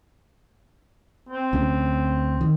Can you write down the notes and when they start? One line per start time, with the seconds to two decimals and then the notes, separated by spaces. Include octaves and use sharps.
1.29 C4
1.53 D2 C#4
2.41 D#3